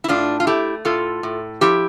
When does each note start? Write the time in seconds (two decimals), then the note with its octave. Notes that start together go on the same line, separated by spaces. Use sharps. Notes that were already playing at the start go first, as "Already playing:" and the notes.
0.04 E4
0.08 A2 D4 F4
0.40 F4
0.47 A3 E4 G4
0.85 A2 F4 A4
1.23 A2
1.61 F3 E4 G4